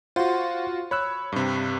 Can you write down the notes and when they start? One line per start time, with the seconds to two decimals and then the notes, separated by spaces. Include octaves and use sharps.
0.16 F4 F#4 C5 F#5 C6
0.91 C#5 B5 E6 F#6
1.32 G2 C3